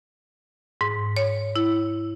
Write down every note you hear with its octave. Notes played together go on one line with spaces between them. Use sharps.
G#2
C#5
E4